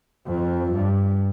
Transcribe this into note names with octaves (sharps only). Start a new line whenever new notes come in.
F2
G2